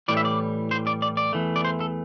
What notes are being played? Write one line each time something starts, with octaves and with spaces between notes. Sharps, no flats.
A2 E3 G3 D5
E5
D5
C5
D5
D5
D5
E2 E3 A3
D5
C5
A4